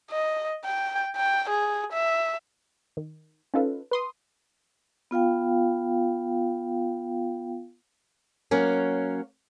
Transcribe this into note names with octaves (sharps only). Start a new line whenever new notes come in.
D#5
G5
G5
G#4
E5
D#3
C#4 D#4 F4 A4 B4
B4 C6 D#6
B3 F4 F5 G5
F#3 A#3 C#4